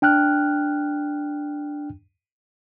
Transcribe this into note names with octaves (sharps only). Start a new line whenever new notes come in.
D4 G5 F6 F#6